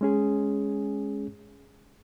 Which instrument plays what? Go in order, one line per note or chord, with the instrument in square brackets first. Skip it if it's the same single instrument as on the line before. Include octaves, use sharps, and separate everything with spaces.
[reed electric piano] G#3 C#4 G#4